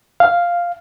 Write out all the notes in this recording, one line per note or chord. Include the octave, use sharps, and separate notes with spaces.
F5